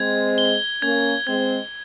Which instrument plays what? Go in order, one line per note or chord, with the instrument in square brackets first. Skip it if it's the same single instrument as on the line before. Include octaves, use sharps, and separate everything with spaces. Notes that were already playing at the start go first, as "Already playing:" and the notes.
Already playing: [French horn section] G#3 C4 [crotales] G#6
[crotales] G7
[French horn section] A#3 C#4 [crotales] G#6
[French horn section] G#3 C4 [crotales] G#6